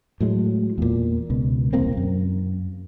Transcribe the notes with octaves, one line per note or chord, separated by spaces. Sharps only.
A2 F#3 G#3
E2 A#2
C#2 B2
E1 C2 A#3 C4
F#2